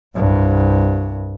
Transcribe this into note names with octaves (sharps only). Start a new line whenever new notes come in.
C2 G2